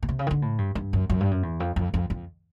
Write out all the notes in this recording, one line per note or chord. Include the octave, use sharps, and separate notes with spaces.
B2
C3
C#3
D#3
D3
A2
G2
G2
F#2
F#2
G2
F#2
E2
F2
F2
F2
F2